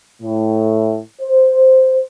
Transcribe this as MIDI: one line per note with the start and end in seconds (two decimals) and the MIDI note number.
0.22 0.98 45
1.22 2.04 72